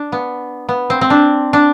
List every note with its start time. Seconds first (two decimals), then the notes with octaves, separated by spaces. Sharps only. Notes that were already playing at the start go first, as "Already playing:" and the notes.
Already playing: D4
0.12 B3
0.69 B3
0.90 C4
1.01 C4
1.10 D4
1.53 D4